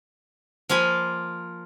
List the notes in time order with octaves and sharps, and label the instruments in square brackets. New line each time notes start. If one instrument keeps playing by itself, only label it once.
[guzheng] F3 A#3 F4 G#5 B5